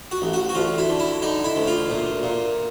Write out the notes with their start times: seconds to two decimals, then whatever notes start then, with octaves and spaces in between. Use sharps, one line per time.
0.11 F#4
0.22 A1
0.33 F#4
0.49 F#4
0.55 D2 F4
0.78 E4
0.89 D3
1.00 E4
1.22 D3 D#4
1.44 E4
1.56 D2
1.67 F4
1.90 A#2
2.23 A#2